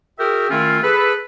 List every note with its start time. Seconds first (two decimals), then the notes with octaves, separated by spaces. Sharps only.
0.19 F#4 G#4 A#4 E5 G5
0.50 D#3 A3 C#4 E4 F4
0.83 G#4 A4 B4